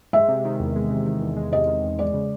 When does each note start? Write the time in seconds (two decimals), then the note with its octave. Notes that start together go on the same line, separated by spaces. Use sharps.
0.13 G#3 E5
0.28 C3
0.45 D#3
0.60 E2
0.76 G#3
0.90 C3
1.07 D#3
1.22 E2
1.37 G#3
1.52 C3 D#5
1.67 D#3
1.84 E2
1.99 G#3 D5
2.14 C#3